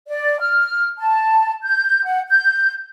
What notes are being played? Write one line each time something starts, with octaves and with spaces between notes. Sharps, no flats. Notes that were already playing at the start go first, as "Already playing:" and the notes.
D5
F6
A5
G6
F#5
G6